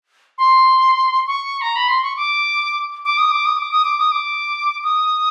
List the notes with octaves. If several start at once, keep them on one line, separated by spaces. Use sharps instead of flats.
C6
C#6
A#5
B5
C6
C#6
D6
D6
D#6
D6
D#6
D6
D#6
D6
D#6
D6
D#6